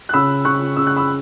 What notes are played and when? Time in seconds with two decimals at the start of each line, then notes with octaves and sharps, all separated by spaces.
0.09 F#6
0.13 C#3 B5 E6
0.45 C#3 C#6 F#6
0.77 C#3 E6
0.87 F#6
0.97 B5 E6